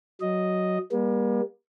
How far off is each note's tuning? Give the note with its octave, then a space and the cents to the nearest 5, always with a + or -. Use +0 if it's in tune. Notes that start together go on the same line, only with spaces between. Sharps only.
F#3 +0 D#5 +0
G3 +30 A#3 +40